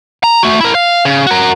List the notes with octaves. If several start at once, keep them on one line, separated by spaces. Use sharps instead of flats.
A#5
A3 F#4
E4 A#4
F5
C#3
F#4 A#4